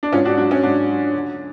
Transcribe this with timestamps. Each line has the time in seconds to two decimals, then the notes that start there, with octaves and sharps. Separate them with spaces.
0.03 D4
0.12 G#2 C#4 F4
0.25 D4 F#4
0.37 F#3 D4
0.51 C#4
0.63 G#2 D4
0.88 F#3
1.13 D2